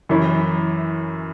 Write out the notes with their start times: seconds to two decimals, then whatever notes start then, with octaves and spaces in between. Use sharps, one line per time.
0.09 F#2 E3 C#4 E4